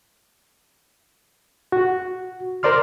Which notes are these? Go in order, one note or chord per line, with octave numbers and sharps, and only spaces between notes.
F#4
A#4 C5 D5 C6 F6